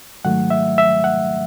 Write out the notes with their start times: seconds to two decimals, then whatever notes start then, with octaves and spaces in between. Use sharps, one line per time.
0.24 G#2 D#3 F#3 A3 F#5
0.50 E5
0.78 E5
1.04 F#5